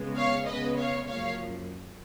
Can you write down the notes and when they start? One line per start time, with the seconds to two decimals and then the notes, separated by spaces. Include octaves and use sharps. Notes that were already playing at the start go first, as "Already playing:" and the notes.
Already playing: C#3 G#3 B3
0.16 C#5 F5
0.46 C#3 G#3 B3 B4 D#5
0.77 C#5 F5
1.07 F#2 F3 A#3 C#5 F5